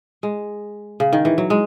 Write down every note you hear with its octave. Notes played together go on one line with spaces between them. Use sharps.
G#3
C#3
D#3
E3
F#3
G#3